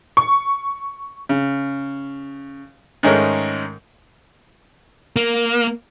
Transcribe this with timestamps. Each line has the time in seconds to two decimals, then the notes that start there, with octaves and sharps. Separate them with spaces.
0.17 C#6
1.29 C#3
3.03 G#2 D#3 G#3 A3 C#4 A#4
5.16 A#3